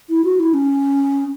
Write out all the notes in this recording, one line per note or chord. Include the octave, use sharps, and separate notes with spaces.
E4
F#4
E4
C#4